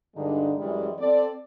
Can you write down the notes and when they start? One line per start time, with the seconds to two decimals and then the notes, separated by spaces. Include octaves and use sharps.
0.16 G2 D3 G#3 D4 D#4
0.57 F#2 E3 G3 G#3
0.98 C4 A4 D5